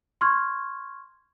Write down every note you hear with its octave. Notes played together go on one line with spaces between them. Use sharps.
C6 C#6 F6 G#6